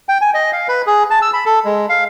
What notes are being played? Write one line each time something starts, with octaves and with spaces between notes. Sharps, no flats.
G5
G#5
D#5
F5
B4
G#4
A5
E6
B5
A4
G#3
F5